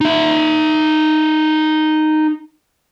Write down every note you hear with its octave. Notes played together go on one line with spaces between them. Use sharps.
D#4 E5